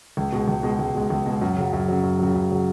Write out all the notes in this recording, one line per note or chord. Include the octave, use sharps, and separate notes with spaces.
C#2
B2 G#3
C#2
B2 G#3
C#2
B2 G#3
C#2
B2 G#3
F#2
C#3 F#3
F#2
C#3 F#3
F#2
C#3 F#3
F#2
C#3 F#3